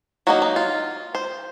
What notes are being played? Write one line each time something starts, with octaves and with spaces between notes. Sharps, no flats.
F#3 A#3 D#4 F#4
D#4
F4
C5